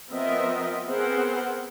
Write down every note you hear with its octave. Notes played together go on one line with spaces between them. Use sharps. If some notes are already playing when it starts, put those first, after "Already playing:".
F3 B3 C4 A#4 D#5 E5
B3 C4 G#4 A#4 C5 F#5